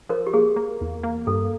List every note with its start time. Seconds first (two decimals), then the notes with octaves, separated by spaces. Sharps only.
0.09 F3 A#4
0.27 G4
0.33 A#3 G#4
0.56 A#3
0.81 E2
1.03 A#3
1.27 G2 A4